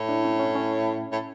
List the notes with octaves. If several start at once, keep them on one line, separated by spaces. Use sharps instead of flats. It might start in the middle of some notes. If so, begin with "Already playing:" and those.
Already playing: A2 E4
D4
C#4
C#4
C#4
A2